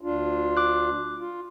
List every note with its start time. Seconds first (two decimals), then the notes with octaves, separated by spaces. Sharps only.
0.01 D2 D4 F4
0.57 D6 F#6
1.18 F4